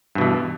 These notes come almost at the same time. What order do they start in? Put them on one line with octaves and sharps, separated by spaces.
G2 B2 E3